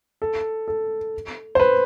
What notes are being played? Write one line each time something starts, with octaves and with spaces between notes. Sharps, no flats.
A4
A4
C5
B4